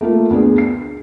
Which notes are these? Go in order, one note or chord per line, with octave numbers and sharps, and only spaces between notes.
A3 A#3 F4 A#4
D2 B3 D4 G#4
C7